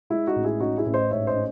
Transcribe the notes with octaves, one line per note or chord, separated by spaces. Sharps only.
G#3 E4
D#4 F#4
A1
E4 G#4
C#4 D#4 F#4
E4 G#4
A1
C5 D#5
G#2 C#5 E5
C5 D#5
C#4